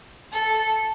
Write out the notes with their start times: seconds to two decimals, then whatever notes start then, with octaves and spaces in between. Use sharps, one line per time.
0.33 A4